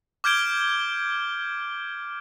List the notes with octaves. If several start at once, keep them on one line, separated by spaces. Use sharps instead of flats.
D6 F6 G6 G#6 D7 G7